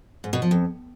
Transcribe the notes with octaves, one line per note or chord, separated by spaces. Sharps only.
G#2
B2
F3
F2